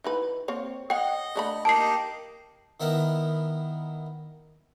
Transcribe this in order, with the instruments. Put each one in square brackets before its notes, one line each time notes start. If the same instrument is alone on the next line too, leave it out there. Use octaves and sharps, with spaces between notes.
[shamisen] E3 D#4 B4
A#3 C4 C#5
[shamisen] C#5 F#5 [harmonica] D#5 [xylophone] G5
[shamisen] D3 A3 B5
[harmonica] A#3 D#4 G4 [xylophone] A5 C7
[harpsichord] D#3 B3 E4 A#4